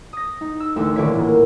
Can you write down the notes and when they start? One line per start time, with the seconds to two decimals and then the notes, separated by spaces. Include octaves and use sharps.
0.13 D#6 A#6
0.41 D#4
0.60 E6
0.76 A1 D2 E6
0.96 D#1 D3 E3 C#5 D5 B6
1.15 A2 A#3